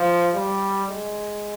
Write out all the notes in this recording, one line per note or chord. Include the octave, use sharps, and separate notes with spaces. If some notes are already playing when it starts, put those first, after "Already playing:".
Already playing: F3
G3
G#3